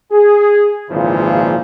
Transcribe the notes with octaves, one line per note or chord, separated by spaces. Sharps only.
G#4
G#1 A#2 C#3 E3 F3